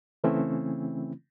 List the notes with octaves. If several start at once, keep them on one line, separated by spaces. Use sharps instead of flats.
C#3 E3 A3 C4 C#4 E4